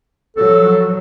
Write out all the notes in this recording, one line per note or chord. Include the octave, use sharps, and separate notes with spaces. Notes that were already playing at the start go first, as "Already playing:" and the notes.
F3 F#3 A4